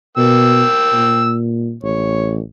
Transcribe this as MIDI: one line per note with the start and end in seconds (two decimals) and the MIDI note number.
0.17 0.63 47
0.17 1.33 58
0.17 1.33 79
0.17 1.33 88
0.93 1.76 46
1.83 2.41 33
1.83 2.36 73